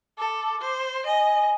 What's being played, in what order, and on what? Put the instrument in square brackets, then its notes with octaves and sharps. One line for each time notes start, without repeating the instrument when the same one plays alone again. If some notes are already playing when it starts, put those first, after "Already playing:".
[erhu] A4 [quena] D6
[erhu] C5
[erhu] D#5 [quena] G#5